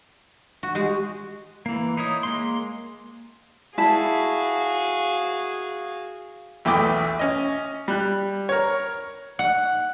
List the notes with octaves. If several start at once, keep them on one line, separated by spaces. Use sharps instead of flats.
F#4
G#3 F#4 G4
E3 A#3
D#4 E4 C#5 D#6
G#3 A#3 C6
E4 F#4 G#4 F5 A5
B1 E2 A3 G5 D6 D#6
C#4 D#5
G3 F#6
A#4 C#5
F#5